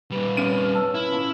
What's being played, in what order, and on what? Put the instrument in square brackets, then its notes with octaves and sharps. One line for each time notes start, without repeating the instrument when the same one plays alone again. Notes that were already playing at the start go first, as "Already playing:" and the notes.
[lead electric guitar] A#2 G3 [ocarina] B4
[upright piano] F1 F6 D#7 [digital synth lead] C#4
[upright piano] A5 E6
[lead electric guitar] E4
[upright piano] A#2